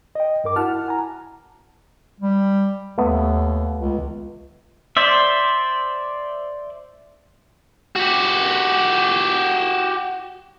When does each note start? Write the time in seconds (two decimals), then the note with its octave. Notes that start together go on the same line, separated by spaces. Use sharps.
0.15 D#5 G5
0.44 G2 A#4 D6
0.56 E4 F#4 F#5 A5 F6
0.88 G#5 A#5
2.20 G3
2.98 D#2 A3 B3
3.78 C#2
4.97 C5 D5 E5
7.96 F#4 G4